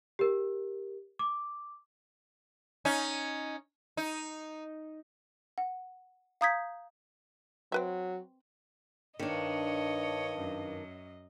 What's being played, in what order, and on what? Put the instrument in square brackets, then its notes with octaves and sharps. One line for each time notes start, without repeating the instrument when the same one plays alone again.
[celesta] G4 A#4
D6
[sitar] C#4 D#4
D#4
[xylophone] F#5
F5 A#5 D#6 G6 G#6 B6
[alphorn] F#3 [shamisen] C4 B4 E5
[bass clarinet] G2 [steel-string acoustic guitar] D#3 D4 [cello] C#5 [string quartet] D#5
[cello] F#2